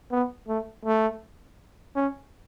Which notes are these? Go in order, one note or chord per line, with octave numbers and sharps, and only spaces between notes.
B3
A3
A3
C#4